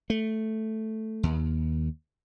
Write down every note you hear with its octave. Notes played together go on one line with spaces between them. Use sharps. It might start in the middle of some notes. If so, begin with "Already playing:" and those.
A3
D#2